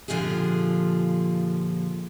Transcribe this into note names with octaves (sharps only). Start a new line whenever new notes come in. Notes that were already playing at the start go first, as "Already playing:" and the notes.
A#2 D3 F3 F4 G4 G#4